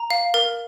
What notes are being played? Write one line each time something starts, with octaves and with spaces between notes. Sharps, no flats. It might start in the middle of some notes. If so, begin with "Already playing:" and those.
Already playing: A#5
F5
A#4